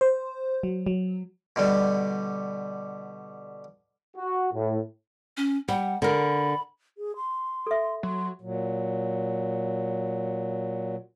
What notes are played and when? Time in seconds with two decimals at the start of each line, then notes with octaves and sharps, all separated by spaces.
0.01 C5
0.63 F#3
0.86 F#3
1.56 B2 D3 G3
4.17 F#4
4.53 A2
5.37 C#4
5.68 G3 F#5
6.02 D3 A#4 B5
6.98 G#4
7.16 C6
7.67 A4 E5
8.03 F#3 C6
8.41 A#2 F#3